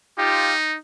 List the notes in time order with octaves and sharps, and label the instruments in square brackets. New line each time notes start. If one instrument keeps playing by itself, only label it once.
[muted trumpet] D#4 [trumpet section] F4 G4